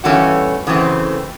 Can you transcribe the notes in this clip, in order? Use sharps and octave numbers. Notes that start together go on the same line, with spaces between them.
G2 E3 A3 C#4 F#4
F#2 C#3 E3 A3 C4